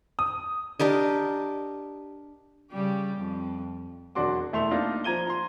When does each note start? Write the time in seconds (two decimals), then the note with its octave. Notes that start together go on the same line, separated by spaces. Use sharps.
0.19 D#6
0.79 D4 G4 A#4 D#5
2.71 C#3 G3 G4
3.18 F2
4.15 E1 F#3 D4 F#4 C6 D6
4.53 E1 A3 E4 E5 C6 F7
4.71 A#3 D4 D#4 F4
5.04 F3 A#5 G#6 D#7 G7
5.27 A#5 C6